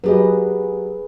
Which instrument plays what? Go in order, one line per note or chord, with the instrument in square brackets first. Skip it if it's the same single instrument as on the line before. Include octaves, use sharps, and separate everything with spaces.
[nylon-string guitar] F#3 G4 D#5 [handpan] G#4 B4